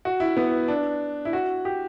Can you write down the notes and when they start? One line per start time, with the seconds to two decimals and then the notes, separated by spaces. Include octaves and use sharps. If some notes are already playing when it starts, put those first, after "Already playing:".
0.05 F#4
0.20 E4
0.37 B3
0.68 D4
1.25 E4
1.33 F#4
1.65 G4